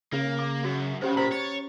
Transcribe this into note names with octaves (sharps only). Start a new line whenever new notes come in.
C#3 A#3
D6
F#2 F#4
C#3 C#4 G4 C5
A#2 G4 C5 A#5 B5
C#5 A6